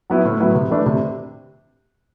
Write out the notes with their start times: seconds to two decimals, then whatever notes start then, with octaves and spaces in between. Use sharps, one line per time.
0.10 F#3 B3 E4
0.25 A2
0.40 F#3 B3 E4
0.55 C3
0.71 E3 A3 D4
0.86 C3